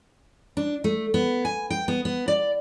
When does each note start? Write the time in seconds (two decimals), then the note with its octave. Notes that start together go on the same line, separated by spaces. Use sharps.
0.57 D4
0.84 A3
1.14 B3
1.45 G#5
1.70 G5
1.88 B3
2.05 B3
2.28 D5